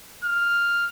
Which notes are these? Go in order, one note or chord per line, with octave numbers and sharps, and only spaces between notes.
F6